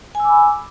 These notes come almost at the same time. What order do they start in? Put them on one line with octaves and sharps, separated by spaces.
G#5 E6 D6 B5